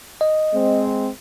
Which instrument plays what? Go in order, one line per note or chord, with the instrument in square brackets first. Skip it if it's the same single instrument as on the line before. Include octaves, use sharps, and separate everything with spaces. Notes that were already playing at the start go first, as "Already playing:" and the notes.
[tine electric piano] D#5
[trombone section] G#3 C4